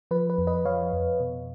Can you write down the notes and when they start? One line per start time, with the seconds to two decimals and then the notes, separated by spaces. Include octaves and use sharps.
0.11 F3 B4
0.30 B4
0.38 F2
0.47 B4 D#5
0.65 F3 C#5 F5
0.93 F2
1.20 B2